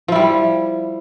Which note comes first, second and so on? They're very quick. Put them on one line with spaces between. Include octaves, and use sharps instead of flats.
F3 E4 G3